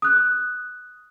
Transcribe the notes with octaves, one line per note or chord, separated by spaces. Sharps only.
D#6 F#6